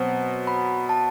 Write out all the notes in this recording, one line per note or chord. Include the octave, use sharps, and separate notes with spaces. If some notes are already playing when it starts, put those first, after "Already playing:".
Already playing: B2 F#3 C4
B5
A5